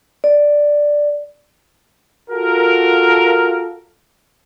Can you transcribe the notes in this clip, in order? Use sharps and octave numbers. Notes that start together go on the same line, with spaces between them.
D5
F4 F#4 A4 A#4